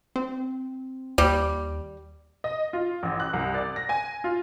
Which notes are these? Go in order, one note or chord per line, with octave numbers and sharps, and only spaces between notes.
C4
D#2 G3
D#5
F4
A1
F#6
C2
D5
A#6
G#5
F4